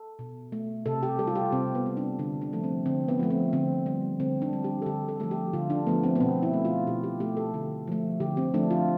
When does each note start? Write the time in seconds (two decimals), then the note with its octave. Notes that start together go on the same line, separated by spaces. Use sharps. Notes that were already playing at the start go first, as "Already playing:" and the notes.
Already playing: A4
0.19 B2
0.52 A3
0.86 C3 A4
1.03 G4
1.19 G3 A4
1.27 F4
1.36 G4
1.52 C3 C4
1.75 B3
1.86 G3
1.97 D4
2.19 D3 D4
2.41 D4
2.53 F3 A3
2.64 C4
2.86 D3 C4
3.08 B3
3.19 F3 A3
3.30 C4
3.53 D3 C4
3.86 G3
4.20 D3 C4
4.42 D4
4.53 G3
4.64 G4
4.82 A4
4.86 D3 G4
5.08 A4
5.20 F3 A3 A4
5.31 G4
5.53 D3 F4
5.70 D4
5.87 F3 A3 B3
6.03 C4
6.15 B3
6.20 B2 C4
6.42 E4
6.53 A3
6.65 F4
6.87 B2 G4
7.03 G4
7.20 A3 G4
7.37 A4
7.54 D3
7.87 F3 A3
8.20 D3 G4
8.37 C4
8.54 F3 A3 D4
8.71 F4